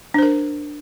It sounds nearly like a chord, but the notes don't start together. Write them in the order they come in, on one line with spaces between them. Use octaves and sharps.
D4 C5 A#4